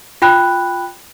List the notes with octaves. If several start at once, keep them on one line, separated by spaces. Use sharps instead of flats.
F4 G5 B5 F#6